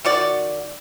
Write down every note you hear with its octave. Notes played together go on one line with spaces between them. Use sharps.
D#3 F#4 D5